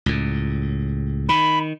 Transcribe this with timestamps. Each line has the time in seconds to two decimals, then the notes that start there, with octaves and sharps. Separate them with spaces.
0.06 C#2 A2
1.29 D#3 B5